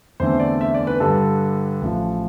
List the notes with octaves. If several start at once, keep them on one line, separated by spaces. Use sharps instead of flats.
E2 D3 A3 C4 C5
D5
E5
D5
B4
G2 D3 G3 D4 A4
A1 A2 F3